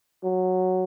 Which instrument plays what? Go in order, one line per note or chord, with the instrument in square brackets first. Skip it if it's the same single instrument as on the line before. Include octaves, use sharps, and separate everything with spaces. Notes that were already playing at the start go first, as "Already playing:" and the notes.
[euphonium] F#3